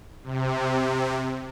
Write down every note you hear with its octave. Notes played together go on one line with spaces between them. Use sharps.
C3